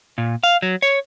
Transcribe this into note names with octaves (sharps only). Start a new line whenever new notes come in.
A#2
F5
F#3
C#5